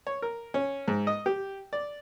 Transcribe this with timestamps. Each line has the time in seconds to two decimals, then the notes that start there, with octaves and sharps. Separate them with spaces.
0.07 C#5
0.22 A#4
0.54 C#4
0.88 G#2
1.07 D#5
1.26 G4
1.73 D5